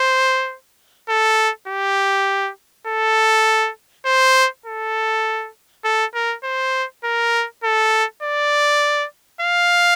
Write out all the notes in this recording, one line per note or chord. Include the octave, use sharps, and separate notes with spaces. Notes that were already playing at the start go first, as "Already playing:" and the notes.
Already playing: C5
A4
G4
A4
C5
A4
A4
A#4
C5
A#4
A4
D5
F5